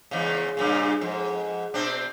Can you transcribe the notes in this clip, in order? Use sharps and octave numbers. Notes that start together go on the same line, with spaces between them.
E2 G#2 C#3
G2 A#2 C#3
F2 G#2
B2 C4 D4